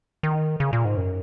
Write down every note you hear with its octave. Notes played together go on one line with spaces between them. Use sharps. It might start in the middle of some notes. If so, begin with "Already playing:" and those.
D#3
C#3
A#2
G#2
F#2